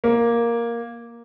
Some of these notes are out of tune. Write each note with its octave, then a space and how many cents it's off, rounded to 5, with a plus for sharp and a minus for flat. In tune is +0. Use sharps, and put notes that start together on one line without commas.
A#3 +5